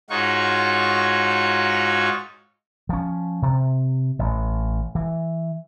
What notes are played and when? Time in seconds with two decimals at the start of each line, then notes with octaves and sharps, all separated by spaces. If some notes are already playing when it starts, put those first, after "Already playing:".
0.10 G#2 D#4 F4 F#4 C#5 C#6
2.89 F3 C#4
3.42 C3
4.19 A1
4.95 E3